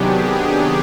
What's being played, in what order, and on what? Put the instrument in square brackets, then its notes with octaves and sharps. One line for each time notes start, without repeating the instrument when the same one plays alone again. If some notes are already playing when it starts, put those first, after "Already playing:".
Already playing: [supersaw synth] C3 D#3 F#3 B3 D4 G4 G#4
G4